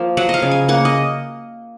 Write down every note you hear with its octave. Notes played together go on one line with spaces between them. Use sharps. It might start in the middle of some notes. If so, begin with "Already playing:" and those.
Already playing: F3 A#3
F#3 F#5
D#5 F5
C#3
G#5
A#3 F#5
D#5